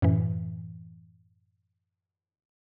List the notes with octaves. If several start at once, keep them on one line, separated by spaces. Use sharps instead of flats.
F#2 A2 E3